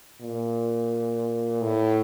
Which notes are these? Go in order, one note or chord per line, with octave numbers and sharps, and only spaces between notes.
A#2
A2